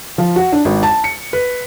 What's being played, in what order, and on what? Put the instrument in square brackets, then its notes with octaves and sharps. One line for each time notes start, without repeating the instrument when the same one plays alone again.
[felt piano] F3
F#4
D4
G#1
A5
C#7
B4